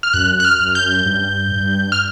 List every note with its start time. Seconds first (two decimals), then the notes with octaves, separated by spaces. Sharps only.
0.03 F6
0.14 F#2 F#6
0.40 F#6
0.45 F6
0.60 F#2
0.75 G6
1.06 G2
1.52 G2
1.92 F6